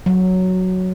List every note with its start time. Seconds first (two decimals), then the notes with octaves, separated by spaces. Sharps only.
0.06 F#3